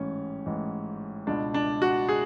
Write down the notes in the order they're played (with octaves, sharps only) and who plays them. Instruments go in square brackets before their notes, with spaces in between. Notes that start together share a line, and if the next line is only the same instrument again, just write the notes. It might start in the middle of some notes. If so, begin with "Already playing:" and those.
Already playing: [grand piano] A1 G#2 E3 C#4
A1 G#2 E3
C#2 B2 D4
D4
F#4
G#4